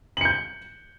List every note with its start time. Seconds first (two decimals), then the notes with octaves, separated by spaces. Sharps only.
0.17 F#7
0.21 C#7
0.25 G6